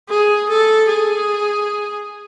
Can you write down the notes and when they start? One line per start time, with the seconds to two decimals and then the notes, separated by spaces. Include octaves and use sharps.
0.10 G#4
0.49 A4
0.89 G#4